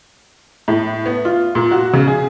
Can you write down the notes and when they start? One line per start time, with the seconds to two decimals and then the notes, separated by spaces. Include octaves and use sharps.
0.68 A2
1.06 B3
1.25 F4
1.55 A#2
1.71 F#4
1.94 C#3
2.07 G#4